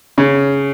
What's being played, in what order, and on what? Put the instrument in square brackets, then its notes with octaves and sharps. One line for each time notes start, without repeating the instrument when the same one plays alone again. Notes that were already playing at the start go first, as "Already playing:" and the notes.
[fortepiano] C#3